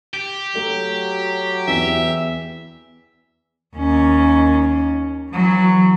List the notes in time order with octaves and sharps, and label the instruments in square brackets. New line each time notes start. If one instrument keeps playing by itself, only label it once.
[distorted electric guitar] G4
[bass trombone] F#3 [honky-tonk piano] A3
[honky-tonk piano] E2 E3 [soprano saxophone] E5
[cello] D#2 C#4
E3 F#3